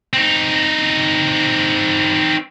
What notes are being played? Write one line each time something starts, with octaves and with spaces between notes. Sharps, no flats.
C4 D#4